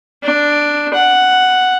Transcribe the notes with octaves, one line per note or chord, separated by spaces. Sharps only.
D4
F#5